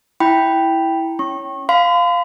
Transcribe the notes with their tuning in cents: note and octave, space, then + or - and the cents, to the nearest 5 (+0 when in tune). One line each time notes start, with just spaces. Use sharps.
E4 +0 G5 +0 B5 +0
C#4 +0 C#6 -30
F5 +0 C6 -45